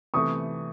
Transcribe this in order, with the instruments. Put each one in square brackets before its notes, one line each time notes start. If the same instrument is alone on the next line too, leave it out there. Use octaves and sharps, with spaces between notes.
[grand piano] C3 E3 A3 [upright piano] C#6 D#6